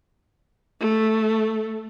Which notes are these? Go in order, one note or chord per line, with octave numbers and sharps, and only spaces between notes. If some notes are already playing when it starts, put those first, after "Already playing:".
A3